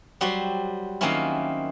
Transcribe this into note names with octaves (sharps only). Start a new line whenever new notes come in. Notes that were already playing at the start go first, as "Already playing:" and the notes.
F#3 G3 F#4 C5
D#3 F#3 A#3 C4 C#4 E4